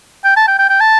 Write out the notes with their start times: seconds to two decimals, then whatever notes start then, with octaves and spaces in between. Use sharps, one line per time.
0.25 G5
0.37 A5
0.48 G5
0.59 G5
0.70 G5
0.80 A5